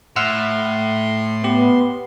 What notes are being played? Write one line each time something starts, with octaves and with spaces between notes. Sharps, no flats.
A2 F#5 C6 E6 F6
B3 G4